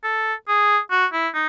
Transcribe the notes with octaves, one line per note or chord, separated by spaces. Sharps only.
A4
G#4
F#4
E4
D#4